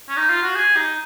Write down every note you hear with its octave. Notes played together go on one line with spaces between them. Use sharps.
C#4
D#4
F4
F#4
G#4
D#4